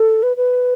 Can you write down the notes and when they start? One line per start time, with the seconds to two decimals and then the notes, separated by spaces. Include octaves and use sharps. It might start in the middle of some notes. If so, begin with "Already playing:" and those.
Already playing: A4
0.23 B4
0.37 B4